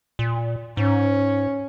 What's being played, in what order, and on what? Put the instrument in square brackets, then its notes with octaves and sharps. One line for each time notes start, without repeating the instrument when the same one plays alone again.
[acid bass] A#2
[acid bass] G#2 [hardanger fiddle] C#4